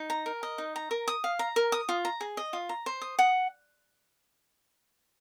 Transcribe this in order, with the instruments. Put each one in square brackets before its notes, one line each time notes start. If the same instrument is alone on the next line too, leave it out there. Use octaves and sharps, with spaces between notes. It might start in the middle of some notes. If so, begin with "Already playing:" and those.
Already playing: [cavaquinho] D#4
A#5
A#4
D#5
D#4
A#5
A#4
D#6
F5
A#5
A#4
D#6
F4
A#5
G#4
D#5
F4
A#5
C5
D#6
F#5